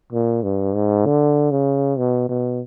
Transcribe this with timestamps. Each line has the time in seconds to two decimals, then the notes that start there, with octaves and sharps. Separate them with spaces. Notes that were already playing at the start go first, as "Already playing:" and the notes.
0.13 A#2
0.43 G2
0.75 G#2
1.06 D3
1.51 C#3
1.98 B2
2.29 B2